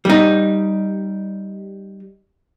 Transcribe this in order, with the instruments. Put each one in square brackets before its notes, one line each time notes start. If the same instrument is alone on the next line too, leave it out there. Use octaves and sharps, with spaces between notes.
[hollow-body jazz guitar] G3 D#4